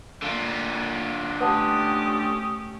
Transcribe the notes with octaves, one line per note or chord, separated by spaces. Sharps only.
D3 A#3 F4
A3 C#4 G4 B4 F#5 A5 D#6